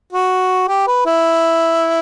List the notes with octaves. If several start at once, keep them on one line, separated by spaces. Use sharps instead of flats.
F#4
G4
B4
E4